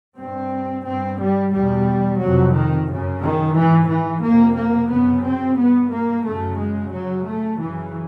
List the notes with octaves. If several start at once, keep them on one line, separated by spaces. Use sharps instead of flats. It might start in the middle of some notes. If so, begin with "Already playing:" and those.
G2 C4
G2 C4
G3
E2 B2 G3
F2 C3 F#3
D#3
F#2 C#3
D#3
G#2 E3
E3
F2 C3 A#3
A#3
F#2 C#3 B3
C4
G2 B3
A#3
F#2 C#3 A3
G#3
F#2 C#3 F#3
A3
F#2 C#3 E3